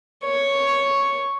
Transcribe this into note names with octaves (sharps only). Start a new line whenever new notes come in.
C#5